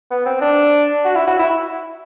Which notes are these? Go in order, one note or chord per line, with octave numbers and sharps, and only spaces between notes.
B3
C4
D4
F#4
E4
F#4
E4